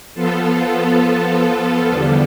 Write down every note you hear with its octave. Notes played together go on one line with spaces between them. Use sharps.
F3 B3 F4 A4
E2 D3 G3